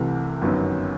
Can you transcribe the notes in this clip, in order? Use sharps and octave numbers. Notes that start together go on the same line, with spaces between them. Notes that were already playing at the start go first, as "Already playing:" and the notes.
Already playing: C2 C3 E3 A3
G1 F#2 D#3 F#3 B3